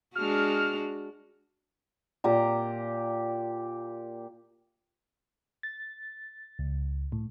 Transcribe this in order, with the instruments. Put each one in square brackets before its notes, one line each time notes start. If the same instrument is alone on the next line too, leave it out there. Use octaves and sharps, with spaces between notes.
[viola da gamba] G#3 D4 F#4 [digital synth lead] F6
[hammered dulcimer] A#2 G4 A#5
[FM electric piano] A6
C#2
A2